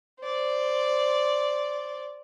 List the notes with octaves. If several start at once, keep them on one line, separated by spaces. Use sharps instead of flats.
C5 D5